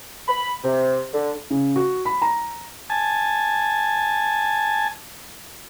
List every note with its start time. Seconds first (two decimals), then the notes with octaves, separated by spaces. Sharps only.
0.28 B5
0.64 C3
1.14 D3
1.50 C#3
1.76 F#4
2.05 B5
2.22 A#5
2.90 G#5 A5